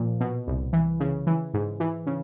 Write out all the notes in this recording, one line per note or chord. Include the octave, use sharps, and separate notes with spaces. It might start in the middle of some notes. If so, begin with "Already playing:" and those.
Already playing: A#2 F3
B2
C2
E3
C#3
E3
G#2
E3
C#3